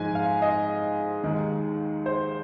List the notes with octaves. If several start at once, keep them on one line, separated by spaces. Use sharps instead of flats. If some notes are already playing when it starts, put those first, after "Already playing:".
Already playing: G#2 F3 G#3 G#5
F5
D#5
D#2 D#3 G#3
C5